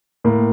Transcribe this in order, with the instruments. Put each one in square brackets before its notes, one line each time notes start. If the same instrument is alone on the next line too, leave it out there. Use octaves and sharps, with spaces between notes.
[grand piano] A2 A#3